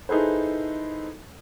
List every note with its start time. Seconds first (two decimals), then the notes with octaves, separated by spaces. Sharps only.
0.09 D#4 E4 G#4 A4 B4 C5